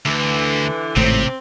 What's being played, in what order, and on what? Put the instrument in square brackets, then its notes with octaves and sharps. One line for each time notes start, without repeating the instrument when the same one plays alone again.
[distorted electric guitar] D2 [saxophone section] D3 E3
[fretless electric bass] G#1 A2 [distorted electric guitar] C3 [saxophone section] C4